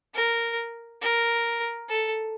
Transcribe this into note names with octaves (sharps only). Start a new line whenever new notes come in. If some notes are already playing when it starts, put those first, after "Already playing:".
A#4
A#4
A4